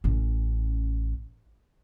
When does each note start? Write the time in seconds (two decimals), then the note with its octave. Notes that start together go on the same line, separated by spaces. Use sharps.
0.04 A1 C#4